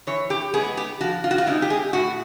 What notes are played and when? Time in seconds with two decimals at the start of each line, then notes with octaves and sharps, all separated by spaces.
0.07 E3 C#5
0.30 G4
0.54 G#3 B3 G#4
0.77 G4
1.01 F3 F#4
1.24 F4
1.31 F#4
1.38 F4
1.47 G#3 C4 D#4 E4
1.62 G4
1.70 G#4
1.93 A2 F#4